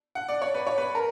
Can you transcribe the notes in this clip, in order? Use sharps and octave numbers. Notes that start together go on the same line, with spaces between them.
F#5
D5
C#5
B4
C#5
B4
A#4